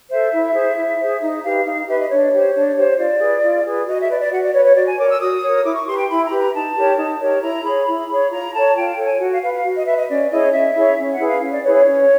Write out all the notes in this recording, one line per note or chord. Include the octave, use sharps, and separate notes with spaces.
A4 C5 E5
E4
G#4 C5
E4
G#4 C5
D#4
G4 B4 F5
D#4 F5
G4 B4 E5
D#5
D4 C#5
G4 C5
D4
G4 C5
F4 D5
G#4 B4
F4
G#4 B4
F#4 D#5
E5
B4 D5
D5
F#4 F#5
D5
B4 C#5
C#5
F#4 D5
G#5
A#4 C#5 D6
E6
F#4 D#6
A#4 C#5
E4 D6
C#6
G4 B4 C6
G5
E4 B5
A#5
G4 B4
A#5
D#4 A5
G4 A#4 C#5
D#4
G4 A#4 C#5
E4 A#5
G#4 C#5 B5
E4
G#4 C#5
F4 A#5
A4 C#5 A5
F4 G5
G5
A4 C#5
G#5
F#4 F#5
F5
B4 F5
F5
F#4
D#5
B4 E5
D#5
C#4 D5
E4 G#4 C#5 D#5
C#4 E5
E4 G#4 C#5
C#4
F#5
E4 G#4 B4
F5
C#4
D5
E4 G#4 B4 C#5
C#5
C#4